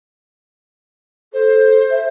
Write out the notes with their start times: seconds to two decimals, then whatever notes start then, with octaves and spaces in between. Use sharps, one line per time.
1.34 A4 C5
1.91 E5